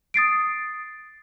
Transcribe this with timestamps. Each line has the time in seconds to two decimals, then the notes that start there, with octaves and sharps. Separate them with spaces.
0.14 D#6 A6 C7 D7